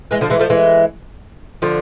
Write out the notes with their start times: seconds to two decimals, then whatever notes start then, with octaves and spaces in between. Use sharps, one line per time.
0.11 E3 G#3
0.21 D3 F3
0.30 E3 G#3
0.39 F3 A3
0.50 E3 G#3
1.62 D3 F3